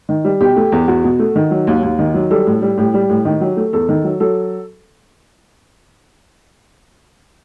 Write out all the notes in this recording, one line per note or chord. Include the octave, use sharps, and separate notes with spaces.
D#3
G3
B2 G4
A3
E2
E2 F#4
B2
A3
D#3
F#3
D#2
D#2
D#3
F#3
G3 A4
A2
G3
A2 G4
G3
A2
D#3
F#3
A3
E2 A4
D#3
F#3
F#3 A4